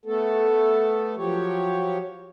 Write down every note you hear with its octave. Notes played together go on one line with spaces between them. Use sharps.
A3 B3 A4
F3 F#3 G4 C#5